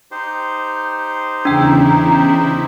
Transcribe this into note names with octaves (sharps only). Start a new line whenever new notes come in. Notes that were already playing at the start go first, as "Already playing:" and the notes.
D#4 G4 C5
E2 C#3 D4 E4 G5 A#5